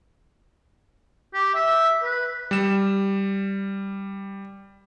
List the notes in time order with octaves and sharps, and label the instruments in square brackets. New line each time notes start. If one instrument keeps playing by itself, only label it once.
[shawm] G4
E5
B4
[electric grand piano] G3 E7